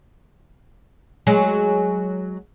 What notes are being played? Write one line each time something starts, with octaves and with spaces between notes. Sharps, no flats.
F#3 G#3